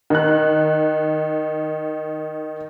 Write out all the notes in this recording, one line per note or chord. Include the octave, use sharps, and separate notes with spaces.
D#3 F#6